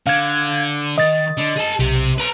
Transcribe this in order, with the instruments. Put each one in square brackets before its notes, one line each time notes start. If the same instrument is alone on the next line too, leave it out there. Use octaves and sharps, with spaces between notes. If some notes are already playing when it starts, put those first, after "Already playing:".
[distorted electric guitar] D3 [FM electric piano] F5 G#6
[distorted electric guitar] D#3 [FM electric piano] D#5 A6
[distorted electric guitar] D3
G#4 A5
[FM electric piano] B1 [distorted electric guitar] C3 G4
[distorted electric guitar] B4 A#5